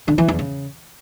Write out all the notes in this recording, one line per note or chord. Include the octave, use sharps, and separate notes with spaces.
D3
E3
E2
C#3